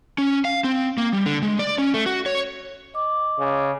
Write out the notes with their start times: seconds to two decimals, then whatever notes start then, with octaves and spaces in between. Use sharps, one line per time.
0.18 C#4
0.45 F5
0.64 C4
0.98 A#3
1.13 G3
1.26 D3
1.42 G#3
1.59 D5
1.78 C#4
1.94 A3
2.06 F#4
2.26 C#5
2.94 D#5 D6
3.39 C#3